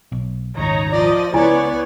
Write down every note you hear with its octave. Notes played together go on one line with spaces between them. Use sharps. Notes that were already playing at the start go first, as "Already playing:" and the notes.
B1
D#1 G#1 C#2 D#4 C#5 A#5
F3 D5 D#5
C#2 B3 E4 C#5 D5 G#5